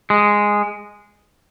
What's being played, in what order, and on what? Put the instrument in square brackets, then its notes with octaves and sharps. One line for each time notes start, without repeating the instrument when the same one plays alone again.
[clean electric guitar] G#3